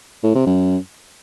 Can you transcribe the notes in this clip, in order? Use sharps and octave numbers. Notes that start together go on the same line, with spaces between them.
A2
C3
F#2